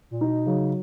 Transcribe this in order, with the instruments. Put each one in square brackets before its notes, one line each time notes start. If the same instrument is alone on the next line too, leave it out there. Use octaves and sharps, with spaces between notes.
[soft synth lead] A#2
[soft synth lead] B2 [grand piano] D#4
[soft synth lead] C#3 [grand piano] F#3